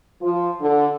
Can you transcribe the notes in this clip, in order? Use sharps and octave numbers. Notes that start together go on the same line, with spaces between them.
F3
D3